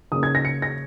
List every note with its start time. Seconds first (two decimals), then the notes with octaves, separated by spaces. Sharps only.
0.12 C#3 A#3 D#6
0.23 G#6
0.35 A#6
0.45 C#7
0.62 A#6